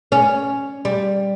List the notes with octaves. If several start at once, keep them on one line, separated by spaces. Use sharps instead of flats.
C#4
G3